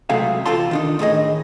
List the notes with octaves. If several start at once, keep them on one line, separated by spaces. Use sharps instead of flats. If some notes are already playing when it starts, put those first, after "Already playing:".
C#2 C3 F#3 A3 G#4 F5
E2 C3 C4 F4 A4 C6
D#3 D4 D#4
A2 D#3 G#4 D#5